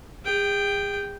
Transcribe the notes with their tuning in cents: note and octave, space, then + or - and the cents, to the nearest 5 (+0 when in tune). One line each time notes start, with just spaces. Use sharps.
G#4 -35 G5 +0